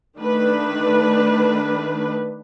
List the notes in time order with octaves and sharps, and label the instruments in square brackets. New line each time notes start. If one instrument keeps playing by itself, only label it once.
[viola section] D#3 A3 D4 B4